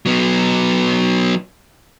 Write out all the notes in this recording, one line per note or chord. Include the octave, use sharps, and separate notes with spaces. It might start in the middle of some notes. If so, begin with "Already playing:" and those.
F#3 B3